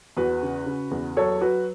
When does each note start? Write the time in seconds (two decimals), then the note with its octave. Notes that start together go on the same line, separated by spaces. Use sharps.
0.16 E2 F#4 B4
0.43 C#3
0.66 C#3
0.91 E2
1.17 F#3 A4 C#5
1.41 F#3 F#4 B4